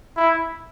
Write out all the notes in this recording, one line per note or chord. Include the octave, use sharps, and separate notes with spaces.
E4